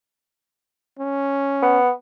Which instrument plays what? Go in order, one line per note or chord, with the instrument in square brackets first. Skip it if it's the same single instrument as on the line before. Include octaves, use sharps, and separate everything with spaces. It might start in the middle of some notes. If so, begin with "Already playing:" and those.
[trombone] C#4
[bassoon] B3